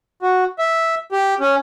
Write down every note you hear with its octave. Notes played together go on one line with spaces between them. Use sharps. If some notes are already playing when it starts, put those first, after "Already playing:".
F#4
E5
G4
C#4